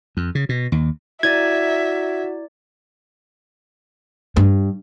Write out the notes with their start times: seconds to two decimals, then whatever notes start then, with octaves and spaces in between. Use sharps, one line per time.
0.17 F2
0.35 C#3
0.49 B2
0.72 D#2
1.23 E4 F#4 D5 E5 G#6 A6
4.37 G2